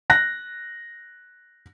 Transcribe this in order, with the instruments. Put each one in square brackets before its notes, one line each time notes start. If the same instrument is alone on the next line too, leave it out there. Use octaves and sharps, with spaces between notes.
[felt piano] F#6 A#6